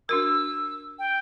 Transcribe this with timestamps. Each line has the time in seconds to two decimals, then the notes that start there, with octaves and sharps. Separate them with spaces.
0.09 D4 F#4 A#4 E6
0.99 G5